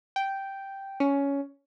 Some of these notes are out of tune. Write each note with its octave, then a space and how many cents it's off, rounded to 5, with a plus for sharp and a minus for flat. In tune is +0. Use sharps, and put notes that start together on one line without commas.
G5 -5
C#4 +10